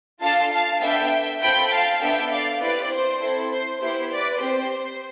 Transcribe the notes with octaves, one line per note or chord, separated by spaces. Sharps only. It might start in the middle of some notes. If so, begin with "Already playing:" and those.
D4 F4 A4 F5 A5
F5 A5
B3 D4 A4 E5 G5
C4 F4 A4 G5 B5
F5 A5
B3 D4 A4 E5 G5
D5 F5
C4 E4 G4 B4 D5
C5
C4 E4 A4
C5
B3 E4 G4 C5
B4 D5
C4 G4 C5